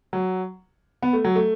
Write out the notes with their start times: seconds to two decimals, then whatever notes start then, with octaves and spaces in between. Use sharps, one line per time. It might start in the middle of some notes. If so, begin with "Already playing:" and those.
0.13 F#3
1.03 B3
1.13 A3
1.25 F#3
1.36 A3